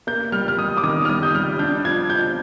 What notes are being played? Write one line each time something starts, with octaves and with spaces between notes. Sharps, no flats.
A#3 G6
G3 F6
F6
G3 D#6
D6
D#3 D#6
F6
G3 D#6
G6
G3 F6
D4 G6
F3 G#6
F3 G6